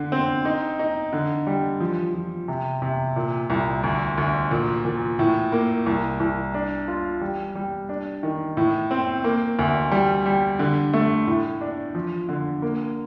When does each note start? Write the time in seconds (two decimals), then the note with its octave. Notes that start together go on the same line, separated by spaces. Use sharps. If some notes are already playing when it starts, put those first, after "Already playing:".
Already playing: D3
0.12 C4
0.45 D#4
0.79 D#4
1.13 D3
1.47 G3
1.80 F3
2.14 F3
2.48 C3
2.82 C3
3.16 A#2
3.50 C2
3.83 D2
4.18 D2
4.51 A#2
4.85 A#2
5.19 A2
5.52 A#3
5.86 C2
6.20 C2
6.54 D4
6.88 F4
7.21 G3
7.55 G3
7.89 D4
8.23 D#3
8.57 A2
8.91 C4
9.24 A#3
9.59 D2
9.91 G3
10.26 G3
10.59 D3
10.93 A3
11.27 A2
11.61 D4
11.95 F3
12.29 D3
12.62 A#3